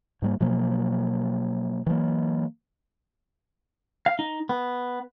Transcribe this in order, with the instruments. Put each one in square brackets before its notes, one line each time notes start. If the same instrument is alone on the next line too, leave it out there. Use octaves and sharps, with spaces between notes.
[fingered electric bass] G#2 G3 A#3
B2 F3 F#3 A#3
E3 F#3 A3 A#3
[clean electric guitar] F5
D#4
B3